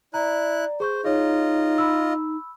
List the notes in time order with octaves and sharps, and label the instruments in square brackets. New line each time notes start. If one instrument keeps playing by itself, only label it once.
[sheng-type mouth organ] E4 F#6 [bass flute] D5 [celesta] A#5
[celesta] G#4 C#6 G6 [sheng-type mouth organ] C5
[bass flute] D#4 [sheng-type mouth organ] F4 D#5 [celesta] G#4 C#5
[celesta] B5 E6